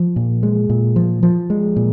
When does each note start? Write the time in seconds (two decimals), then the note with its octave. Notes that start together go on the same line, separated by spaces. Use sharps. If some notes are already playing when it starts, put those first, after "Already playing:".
Already playing: F3
0.16 A#2
0.43 G#3
0.70 A#2
0.96 F3
1.23 F3
1.50 G#3
1.76 A#2